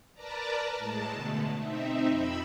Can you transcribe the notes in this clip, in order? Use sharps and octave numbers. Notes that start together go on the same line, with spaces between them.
A#4 B4 D5 A5 A#5
A2 G#3 A5
B2 D3 A3
C4 D#4 E5
F2 B5 E6